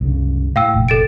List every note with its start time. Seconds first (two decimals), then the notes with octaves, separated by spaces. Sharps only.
0.01 C2 F#2 C#3
0.56 A2 F5 G5 E6
0.74 F1 A#1
0.88 A4 A6 D7